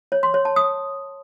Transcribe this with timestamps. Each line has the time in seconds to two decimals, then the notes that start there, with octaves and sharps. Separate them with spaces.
0.12 C#5
0.23 C6
0.34 C#5
0.45 A5
0.56 D#6